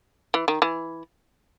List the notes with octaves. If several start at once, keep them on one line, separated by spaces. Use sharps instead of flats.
E3
D#3
E3